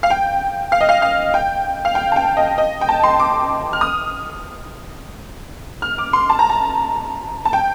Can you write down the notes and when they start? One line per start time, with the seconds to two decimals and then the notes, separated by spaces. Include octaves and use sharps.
0.03 F5
0.10 G5
0.72 F5
0.81 D#5
0.89 F5
1.02 F5
1.34 G5
1.85 F5
1.95 G5
2.12 A5
2.16 G5
2.37 D#5
2.58 D#5
2.81 G5
2.89 A5
3.03 C6
3.20 D6
3.73 F6
3.81 D#6
5.82 F6
5.98 D6
6.13 C6
6.30 A5
6.39 A#5
6.50 A5
7.45 A5
7.53 G5